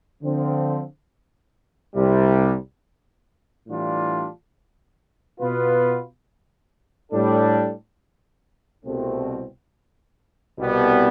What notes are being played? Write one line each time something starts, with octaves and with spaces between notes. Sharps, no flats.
D3 F3 C4
C2 C3 G3
A2 E3 G3 D4 F4
B2 B3 F4 B4
A2 G3 D4 A4
C2 B2 A3 C4
C2 B2 G3 B3